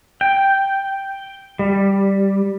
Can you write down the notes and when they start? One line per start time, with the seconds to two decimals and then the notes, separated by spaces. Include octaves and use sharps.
0.21 G5
1.59 G3